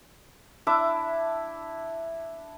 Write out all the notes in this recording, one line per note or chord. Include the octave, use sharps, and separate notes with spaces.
D4 E4 E5 D6